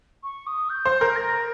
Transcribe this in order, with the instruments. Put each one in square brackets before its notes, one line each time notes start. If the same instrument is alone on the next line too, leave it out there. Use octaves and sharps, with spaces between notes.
[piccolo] C#6
D#6
G6
[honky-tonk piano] C5
A#4
[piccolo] A#6